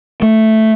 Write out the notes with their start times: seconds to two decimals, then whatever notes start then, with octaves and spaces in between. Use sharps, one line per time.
0.22 A3